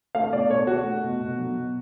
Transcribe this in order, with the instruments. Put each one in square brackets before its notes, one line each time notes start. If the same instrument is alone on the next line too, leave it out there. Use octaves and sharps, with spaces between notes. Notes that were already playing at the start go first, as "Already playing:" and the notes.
[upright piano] A3 F5
B2 D5
A3 C#5
A3 F#4
A3
B2
B2
F#3
B2